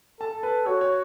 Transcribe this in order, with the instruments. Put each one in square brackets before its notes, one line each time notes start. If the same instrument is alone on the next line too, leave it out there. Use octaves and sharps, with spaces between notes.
[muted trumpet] A4 [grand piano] A5
[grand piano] B4
[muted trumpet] F#4 [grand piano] C#5
[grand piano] C#5